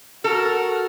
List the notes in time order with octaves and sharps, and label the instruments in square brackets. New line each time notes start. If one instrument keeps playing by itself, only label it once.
[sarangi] F#4 [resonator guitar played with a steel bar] A4 [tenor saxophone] A#4